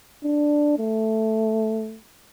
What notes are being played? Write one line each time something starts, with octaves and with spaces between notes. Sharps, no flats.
D4
A3